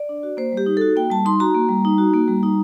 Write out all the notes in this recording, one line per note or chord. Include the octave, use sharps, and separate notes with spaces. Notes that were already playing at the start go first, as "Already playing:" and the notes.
Already playing: D5
D4
F#4
A#3 C5
G3
G4
D#4
F#4 A4
A#3 G5
G3 A5
D#4 C6
F#4 A#5
A#3
G3
D#4
F#4
A#3
G3
D#4